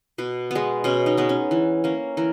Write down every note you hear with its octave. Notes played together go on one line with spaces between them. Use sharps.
B2 B4
G#3 B3
B2 C#4
D#4
G#3 B3
C#4
E3
A#3 C#4
E3 A#4